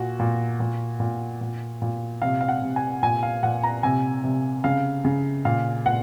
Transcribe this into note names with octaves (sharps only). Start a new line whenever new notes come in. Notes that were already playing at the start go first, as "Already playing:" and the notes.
Already playing: A#2 F#4
A#2
A#2
A#2
A#2
A#2
C3 F5
F5
F#5
C3
G#5
A#2 G#5
F5
A#2 F#5
A#5
C3 G#5
C3
C#3 F5
C#3
A#2 F5
A#2 F#5